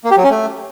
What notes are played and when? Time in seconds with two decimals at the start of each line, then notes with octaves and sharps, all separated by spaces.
0.04 A#3
0.11 G4
0.17 F#3
0.24 C#4
0.30 A3